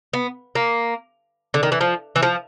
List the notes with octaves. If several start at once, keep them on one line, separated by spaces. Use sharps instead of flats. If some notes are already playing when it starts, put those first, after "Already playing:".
B3
A#3
D3
D#3
E3
F3
E3
F3